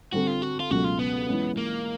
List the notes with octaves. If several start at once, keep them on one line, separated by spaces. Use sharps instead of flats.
D3 G3 C4 F#4
F4
F#4
F4
C#2 B2 F#3 A3 F#4
F4
B3
E3 G#3 C#4
A#3